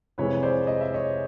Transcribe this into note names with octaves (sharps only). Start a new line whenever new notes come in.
F2 C3 E3 G#3 B4 C#5
C5 D5
D#5
E5
C#5 D#5